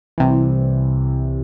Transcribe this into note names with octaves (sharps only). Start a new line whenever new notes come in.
C2 C3 E3